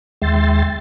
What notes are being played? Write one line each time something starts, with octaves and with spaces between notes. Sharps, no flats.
D#2 G#3 E5 G5 C6 A6